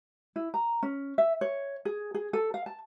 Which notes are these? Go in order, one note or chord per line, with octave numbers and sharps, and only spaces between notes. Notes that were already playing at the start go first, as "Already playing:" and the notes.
E4
A#5
C#4
E5
C#5
G#4
G#4
A4
F5
A5